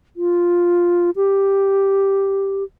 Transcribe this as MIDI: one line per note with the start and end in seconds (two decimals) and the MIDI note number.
0.16 1.10 65
1.16 2.63 67